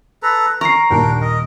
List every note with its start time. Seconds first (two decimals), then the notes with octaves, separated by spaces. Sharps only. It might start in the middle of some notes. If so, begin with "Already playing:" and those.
0.23 A4 B4 A#5
0.61 A#4 A#5 C#6 C7
0.90 D#2 A#2 G3 D4 A#4 G5
1.21 A#4 D#5